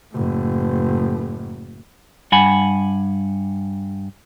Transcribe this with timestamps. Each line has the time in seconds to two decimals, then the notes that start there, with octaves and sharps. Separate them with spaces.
0.13 F#1 A2
2.32 G2 F#5 G#5 B5